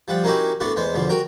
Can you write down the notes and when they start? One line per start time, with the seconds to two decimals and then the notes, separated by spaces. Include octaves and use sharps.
0.08 F3 G3 F#5
0.24 A#3 C#4 D#4 E4 F#4 G4
0.60 A2 A3 B3 D4 F#4
0.76 E2 G#3 B3 C5
0.94 E2 B2 D3 F3
1.09 F#4 A#4 G5 A#5